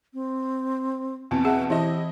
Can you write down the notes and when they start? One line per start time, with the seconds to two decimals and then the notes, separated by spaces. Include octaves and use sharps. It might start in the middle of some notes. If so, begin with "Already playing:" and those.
0.14 C4
1.31 E2 B2 C4 A5
1.45 G#4 E5 F#5
1.70 E3 E4 G4 D#5 A5